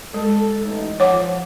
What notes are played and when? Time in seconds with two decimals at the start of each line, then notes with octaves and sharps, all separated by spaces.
0.14 G#3 A4
0.63 A1 D#4
1.00 F3 C#5 F#5 D6